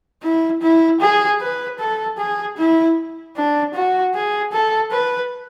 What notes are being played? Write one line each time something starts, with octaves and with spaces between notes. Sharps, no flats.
E4
E4
G#4
B4
A4
G#4
E4
D4
F#4
G#4
A4
B4